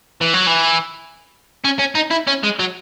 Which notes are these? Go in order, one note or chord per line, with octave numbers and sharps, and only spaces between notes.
E3
F#3
E3
C#4
C#4
D#4
E4
C#4
G#3
F#3